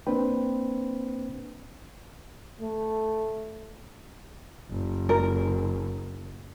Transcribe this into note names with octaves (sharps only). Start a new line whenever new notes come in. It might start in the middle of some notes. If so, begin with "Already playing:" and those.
A#3 C4 D4 B4 C5 G5
A3
F#1
A#4